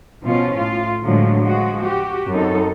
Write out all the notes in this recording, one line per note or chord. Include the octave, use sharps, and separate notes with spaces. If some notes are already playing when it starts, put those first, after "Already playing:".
B2 F3 C#4 F4
A2 F4
A2 D3 F3 F#3 G#3
F3 G#3 F#4
F#4 G4
F#2 C4 D#4 A4